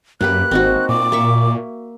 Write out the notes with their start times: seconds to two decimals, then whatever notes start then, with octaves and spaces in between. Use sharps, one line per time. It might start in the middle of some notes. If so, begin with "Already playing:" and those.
0.21 F#2 A#3 G4 B4 F#6
0.51 G#1 C4 D#4 F#4
0.89 A#2 D6
1.12 A#3 E5 C#6